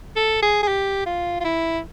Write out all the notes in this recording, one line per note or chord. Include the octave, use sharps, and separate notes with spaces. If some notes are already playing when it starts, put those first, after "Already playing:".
A4
G#4
G#4
G4
F4
F4
E4